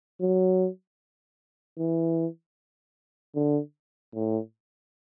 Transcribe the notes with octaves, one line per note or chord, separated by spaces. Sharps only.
F#3
E3
D3
A2